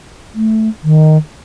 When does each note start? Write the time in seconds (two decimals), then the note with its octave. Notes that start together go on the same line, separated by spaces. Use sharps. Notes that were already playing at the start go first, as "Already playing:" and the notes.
0.35 A3
0.84 D#3